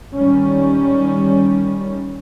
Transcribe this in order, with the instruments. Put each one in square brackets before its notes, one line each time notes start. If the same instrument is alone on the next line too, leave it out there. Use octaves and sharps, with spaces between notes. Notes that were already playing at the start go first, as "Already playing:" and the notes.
[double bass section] D#3 G3 C#4